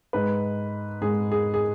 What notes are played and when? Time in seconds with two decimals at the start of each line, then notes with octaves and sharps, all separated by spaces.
0.13 G#2 G#3 B4
1.02 G#2 G#3 G#4
1.32 G#4
1.54 G#4